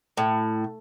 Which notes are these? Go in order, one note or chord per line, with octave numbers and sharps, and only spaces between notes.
A2